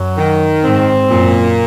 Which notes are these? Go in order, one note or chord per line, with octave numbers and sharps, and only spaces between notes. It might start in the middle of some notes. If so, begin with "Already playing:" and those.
Already playing: F#2 F#3
D#3
G#2 C4
F#2 A#2